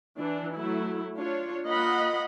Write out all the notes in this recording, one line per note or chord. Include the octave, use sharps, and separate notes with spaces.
E3 D4
F#3 A3 E4
D4 F4 C#5
A#3 F4 D#5 F#5 B5